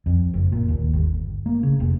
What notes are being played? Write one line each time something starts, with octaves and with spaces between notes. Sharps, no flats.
F2
F#1
A#2
D#2
G1
A#3
C#3
F1